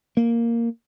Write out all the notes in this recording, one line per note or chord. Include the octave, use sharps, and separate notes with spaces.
A#3